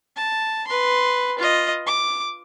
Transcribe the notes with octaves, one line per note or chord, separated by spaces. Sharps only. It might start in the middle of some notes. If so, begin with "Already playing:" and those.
A5
B4 C6
F4 D#5
D6